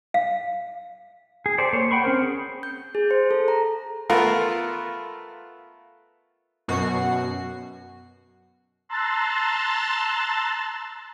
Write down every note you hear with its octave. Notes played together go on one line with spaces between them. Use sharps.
F5
G#4
G4 A4 C5 D5
A#3 C5 C#5
F#5 G5 B5 C#6
C4 C#4 A#4 C5
G#4
G6
G#4
C5
A4
A#5
A3 B3 F4 A#4
F#2 B2 F#4 C7
A5 A#5 C6 E6 F#6 A6